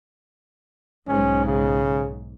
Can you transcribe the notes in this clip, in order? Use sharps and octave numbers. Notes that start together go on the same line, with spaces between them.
B1 G#2 C#4
C#3